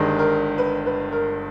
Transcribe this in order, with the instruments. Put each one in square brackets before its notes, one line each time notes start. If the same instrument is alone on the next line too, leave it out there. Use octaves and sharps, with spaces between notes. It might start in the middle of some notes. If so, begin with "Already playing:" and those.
Already playing: [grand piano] G1 G2 D#3 G#3
[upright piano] A#4
B4
B4
A#4